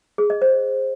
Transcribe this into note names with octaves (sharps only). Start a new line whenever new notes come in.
G#4
D#5
C5